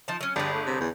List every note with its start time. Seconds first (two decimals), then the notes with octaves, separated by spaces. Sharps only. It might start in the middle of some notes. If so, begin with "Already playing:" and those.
0.08 F3 D#4 A5
0.21 F#3 C#4
0.36 G1 G3 G#4 B4
0.53 A3
0.66 C3
0.81 E2